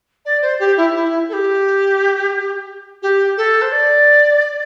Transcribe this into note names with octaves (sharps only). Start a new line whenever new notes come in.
D5
C5
G4
E4
E4
A4
G4
G4
A4
C5
D5